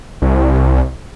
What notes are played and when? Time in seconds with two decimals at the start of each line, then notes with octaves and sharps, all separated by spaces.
0.22 C2